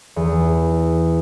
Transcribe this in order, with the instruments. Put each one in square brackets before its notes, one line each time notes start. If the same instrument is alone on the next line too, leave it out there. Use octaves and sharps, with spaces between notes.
[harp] E2